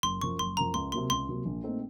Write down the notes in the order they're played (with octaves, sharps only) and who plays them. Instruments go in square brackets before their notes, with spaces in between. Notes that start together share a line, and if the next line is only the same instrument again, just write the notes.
[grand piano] F#1 [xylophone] C6
[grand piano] F#2 F3 [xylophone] C#6
[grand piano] F#1 [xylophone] C6
[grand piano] F#2 F3 [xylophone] A#5
[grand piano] C#2 [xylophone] C6
[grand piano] C3 F#3 A#3 [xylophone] C6
[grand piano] C#2 [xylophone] C6
[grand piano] C3 F#3 A#3
A#1
A#2 A3 C4 D#4